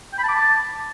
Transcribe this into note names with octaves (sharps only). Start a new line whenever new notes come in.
G5
B5
A5
D6
A5